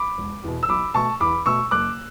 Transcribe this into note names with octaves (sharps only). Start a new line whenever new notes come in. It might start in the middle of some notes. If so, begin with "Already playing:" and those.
Already playing: B5 D6
E1
E2 B2
E6
B1 B5 D6
B2 A3 A5 C#6
E2 B5 D6
B2 A3 C#6 E6
F#1 D6 F#6